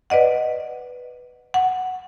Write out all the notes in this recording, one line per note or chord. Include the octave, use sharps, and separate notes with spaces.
B4 D5 D#5 F#5
F#5